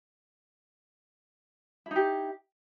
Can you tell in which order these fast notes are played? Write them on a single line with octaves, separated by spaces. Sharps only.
E4 D#4 G4